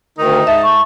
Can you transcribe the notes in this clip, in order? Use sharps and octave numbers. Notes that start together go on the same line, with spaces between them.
D2 D#3 D#4
G#2 E5 A5
C#6